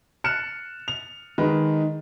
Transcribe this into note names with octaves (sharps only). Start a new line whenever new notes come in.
F6 F#6 C#7 E7
F7
D#3 G#3 B4